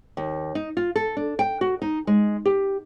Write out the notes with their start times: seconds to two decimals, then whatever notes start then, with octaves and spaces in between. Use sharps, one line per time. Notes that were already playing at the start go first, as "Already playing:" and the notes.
0.17 D#2
0.55 D#4
0.77 F4
0.96 A4
1.17 D4
1.39 G5
1.61 F#4
1.82 D#4
2.07 G#3
2.45 G4